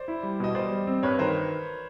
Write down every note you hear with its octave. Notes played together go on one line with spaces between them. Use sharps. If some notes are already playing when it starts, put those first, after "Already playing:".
Already playing: C5 D5
E4
G3
B2 D#5
G3 C5 D5
G3
C4
G2 B4 C#5
D#3 A#4 C5